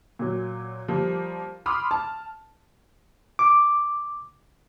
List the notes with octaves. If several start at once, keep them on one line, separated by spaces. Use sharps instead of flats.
A#2 F#3
F3 G3 A#3
B5 C6 D6 D#6 F6
A5
D6